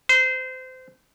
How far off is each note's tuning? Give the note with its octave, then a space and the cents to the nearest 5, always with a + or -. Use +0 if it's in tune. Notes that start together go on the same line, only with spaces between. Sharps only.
C5 -25